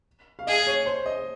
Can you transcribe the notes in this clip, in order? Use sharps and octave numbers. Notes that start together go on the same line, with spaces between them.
F5
G#4 D#5
C#5
C5
D#5